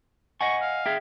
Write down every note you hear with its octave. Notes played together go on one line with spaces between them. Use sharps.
D#5 F#5 G#5 C#6
F5
G#4 E5 G5